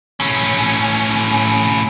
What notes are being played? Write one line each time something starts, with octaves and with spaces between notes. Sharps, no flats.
A2 C#4